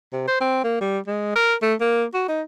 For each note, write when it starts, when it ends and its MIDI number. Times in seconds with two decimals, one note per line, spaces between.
0.12 0.26 48
0.27 0.36 72
0.41 0.59 60
0.64 0.79 58
0.81 0.98 55
1.07 1.32 56
1.35 1.54 70
1.62 1.74 57
1.80 2.04 58
2.14 2.25 66
2.29 2.42 63